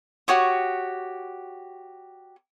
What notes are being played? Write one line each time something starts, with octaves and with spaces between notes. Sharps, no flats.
F#4 G4 C#5 D#6